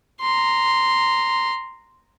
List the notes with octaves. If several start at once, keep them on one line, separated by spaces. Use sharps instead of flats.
A#5 C6